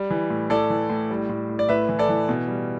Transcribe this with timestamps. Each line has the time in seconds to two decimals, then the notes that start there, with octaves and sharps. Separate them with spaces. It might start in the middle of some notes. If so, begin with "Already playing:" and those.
Already playing: G3
0.10 E3
0.30 A2
0.50 A2 A4 D5
0.70 E3
0.90 A2
1.10 G3
1.29 A2
1.49 A2
1.59 D5
1.69 A2 B4 E5
1.89 E3
1.99 A4 D5
2.09 E3
2.29 B2
2.48 G3